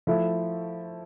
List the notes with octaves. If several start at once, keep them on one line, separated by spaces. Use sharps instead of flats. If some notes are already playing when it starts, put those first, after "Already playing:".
F3 A3 E4